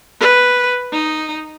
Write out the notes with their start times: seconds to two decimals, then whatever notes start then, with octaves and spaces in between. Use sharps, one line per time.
0.20 B4
0.93 D#4